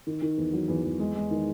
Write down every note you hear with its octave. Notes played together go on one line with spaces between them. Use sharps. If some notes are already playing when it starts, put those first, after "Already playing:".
D#3
D#3
E2
F#3
E2
E2
G#3
G#3
D#3